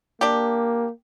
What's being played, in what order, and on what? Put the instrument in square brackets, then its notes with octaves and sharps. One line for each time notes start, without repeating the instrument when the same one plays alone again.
[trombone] A#3 [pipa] D4 G4